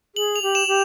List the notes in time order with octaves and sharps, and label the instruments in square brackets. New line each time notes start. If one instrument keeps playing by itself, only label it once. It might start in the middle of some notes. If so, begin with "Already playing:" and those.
[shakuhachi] G#4 [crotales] F#7
[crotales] F7
[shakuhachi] G4
[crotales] E7
[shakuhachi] G4